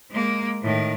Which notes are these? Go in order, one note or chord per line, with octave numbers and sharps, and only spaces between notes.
G#3 A#3
A2 D#3